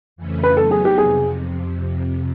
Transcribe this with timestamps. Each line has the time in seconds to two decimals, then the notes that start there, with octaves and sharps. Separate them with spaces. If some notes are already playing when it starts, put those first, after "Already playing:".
0.16 F2 C#3 E3 A3 C#4
0.43 B4
0.57 F#3 B3 D#4 A4
0.71 G#4
0.85 G4
0.98 F2 C3 G#4